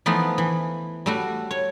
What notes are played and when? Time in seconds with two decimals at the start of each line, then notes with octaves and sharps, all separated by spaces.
0.06 E3 F3 A3 B3 D#4 F4
0.38 E3
1.06 G3 A3 F#4
1.51 C#5